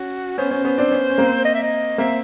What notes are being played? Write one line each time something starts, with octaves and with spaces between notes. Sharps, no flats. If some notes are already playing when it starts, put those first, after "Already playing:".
Already playing: C#4 F#4
B3 C#4 C5
B3 C#4
B3 C#4
C4 D4
B3 C#4
C#4
A#3 C4
D#5
E5
D#5
A#3 C4 E5